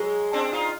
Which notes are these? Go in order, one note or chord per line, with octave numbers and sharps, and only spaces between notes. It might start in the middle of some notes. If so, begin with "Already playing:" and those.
Already playing: F#3 G#3
C4 D4
D#4 F4